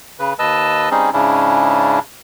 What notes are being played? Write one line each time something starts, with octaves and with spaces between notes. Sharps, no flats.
C#3 B4
D#2 B4 D#5 A5 E6
G3 C4 C#4 D#4 G#4
G#2 C#3 C#4 D4 E4